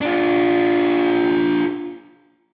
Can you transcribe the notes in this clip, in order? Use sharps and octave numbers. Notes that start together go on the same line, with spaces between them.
D4 F4